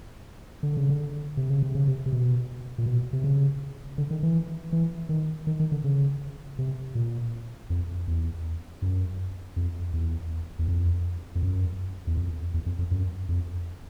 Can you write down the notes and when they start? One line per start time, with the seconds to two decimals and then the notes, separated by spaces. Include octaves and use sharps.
0.63 D3
0.77 C#3
0.90 D3
1.37 C3
1.50 C#3
1.63 C3
1.75 C#3
1.87 C3
2.06 C3
2.13 B2
2.78 A#2
2.86 B2
3.13 C3
3.24 C#3
3.98 D3
4.11 D#3
4.23 E3
4.73 E3
5.09 D#3
5.47 D#3
5.60 D#3
5.72 D3
5.84 C#3
6.59 C3
6.95 A#2
7.70 F2
8.07 E2
8.82 F#2
9.56 F2
9.93 E2
10.59 E2
10.68 F2
11.35 F2
11.43 F#2
12.07 E2
12.17 F2
12.54 E2
12.66 F2
12.79 F2
12.91 F#2
13.29 F2